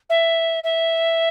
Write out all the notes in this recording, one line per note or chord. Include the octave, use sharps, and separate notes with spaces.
E5
E5